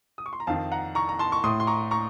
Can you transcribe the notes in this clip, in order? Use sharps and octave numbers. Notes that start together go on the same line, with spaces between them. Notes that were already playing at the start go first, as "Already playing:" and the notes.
D#6
C#6
C6
A#5
F2 D#3 F5 A5
F#5 A#5
A#5 C#6
A#5
A5 C6
C#6
A2 C6 D#6
C6
A#5 C#6
A#5 C#6